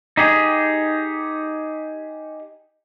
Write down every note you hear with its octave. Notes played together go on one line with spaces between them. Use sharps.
D#4 G4 G#4